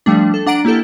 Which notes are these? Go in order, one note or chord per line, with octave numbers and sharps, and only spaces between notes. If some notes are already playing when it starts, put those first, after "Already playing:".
F3 G3 A3 D4
A4
D4 F#5 A#5 D7
A#3 E4 G4 A4